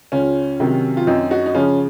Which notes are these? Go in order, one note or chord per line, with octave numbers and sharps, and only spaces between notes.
C#2 C#4 F4
C3 D#3 F#3
F4
F#2 C4 D#4
D#4 F#4
D#4
C#3 F3 C#4 F4